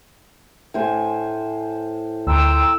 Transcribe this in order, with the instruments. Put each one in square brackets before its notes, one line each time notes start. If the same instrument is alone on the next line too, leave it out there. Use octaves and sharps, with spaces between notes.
[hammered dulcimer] A2 C5 G#5
[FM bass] D2 [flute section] G5 A#5 C6 [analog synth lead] E6